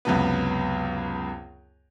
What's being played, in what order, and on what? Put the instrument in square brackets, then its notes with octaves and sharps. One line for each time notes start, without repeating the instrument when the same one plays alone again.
[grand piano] C#2 F#2 C3 B3